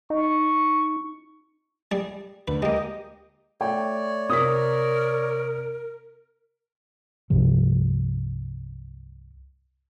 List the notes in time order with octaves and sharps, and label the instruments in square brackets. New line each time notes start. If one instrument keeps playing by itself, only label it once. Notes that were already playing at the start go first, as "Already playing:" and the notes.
[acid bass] D#4 [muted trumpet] C#6
[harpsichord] G3 G#4
[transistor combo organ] D2 [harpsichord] B4
[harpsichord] G#3 A#3 [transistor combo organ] G4 D#5
[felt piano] A3 [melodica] C#5 D5 [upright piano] G5
[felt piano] C3 B6 [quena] A#4 [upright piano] D#6
[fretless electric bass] C2 G2 C3 F3